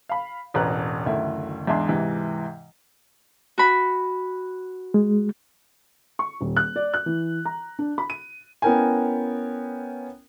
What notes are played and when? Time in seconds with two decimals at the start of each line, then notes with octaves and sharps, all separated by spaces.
0.09 F5 B5
0.54 E1 A1 B4 A#5 F#6
1.06 F#1 D2 D#3 A3 E4
1.67 E2 G#2 D4 E5 G#5 C6
1.88 G#2 C3 E3
3.58 F#4 B5
4.94 G#3
6.19 C#6
6.41 D#1
6.57 F#6
6.76 D5
6.94 F#6
7.06 E3
7.45 A#5
7.79 D4
7.98 B5
8.10 D#7
8.62 B3 C#4 E4 A#4 G5 G#5